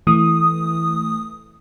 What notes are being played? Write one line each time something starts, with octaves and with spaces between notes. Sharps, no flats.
E3 A3 D#6